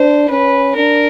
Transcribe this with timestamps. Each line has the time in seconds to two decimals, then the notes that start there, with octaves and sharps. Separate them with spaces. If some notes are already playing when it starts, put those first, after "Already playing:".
Already playing: D4 C5
0.30 C#4 B4
0.76 D4 A#4